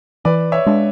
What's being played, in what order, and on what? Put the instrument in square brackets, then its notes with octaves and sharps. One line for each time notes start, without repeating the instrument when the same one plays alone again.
[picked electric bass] E3 [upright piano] B4 D5
[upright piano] C#5 E5
[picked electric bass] G#3 D4